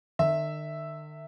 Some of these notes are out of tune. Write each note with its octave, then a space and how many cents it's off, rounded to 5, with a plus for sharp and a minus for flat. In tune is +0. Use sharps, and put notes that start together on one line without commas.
D#3 -45 E5 +0